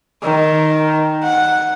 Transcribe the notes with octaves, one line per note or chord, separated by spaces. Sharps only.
D#3
F#5